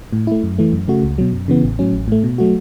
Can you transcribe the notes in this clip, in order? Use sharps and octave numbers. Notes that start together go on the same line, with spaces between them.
A2
A3 E4
F#2
E3 A3
F#2
C#3 A3 F#4
C#2
B2 F#3
F#2
C#3 E3 B3
A1
A2 F#3 C#4
A1
A2 A3
B2
F#3 A3 F#4